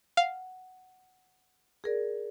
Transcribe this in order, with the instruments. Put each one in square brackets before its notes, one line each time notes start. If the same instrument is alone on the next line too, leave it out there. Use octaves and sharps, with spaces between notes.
[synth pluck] F5 [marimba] F#5
[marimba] G#4 A#4 D5